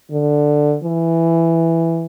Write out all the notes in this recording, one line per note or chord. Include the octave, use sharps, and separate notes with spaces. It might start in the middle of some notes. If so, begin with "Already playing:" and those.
D3
E3